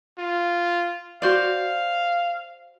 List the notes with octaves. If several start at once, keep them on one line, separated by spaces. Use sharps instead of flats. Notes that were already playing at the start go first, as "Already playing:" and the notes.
F4
F#4 C5 D5 F5